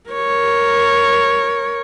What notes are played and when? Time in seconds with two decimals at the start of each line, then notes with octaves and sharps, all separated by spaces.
0.11 A#4 C#5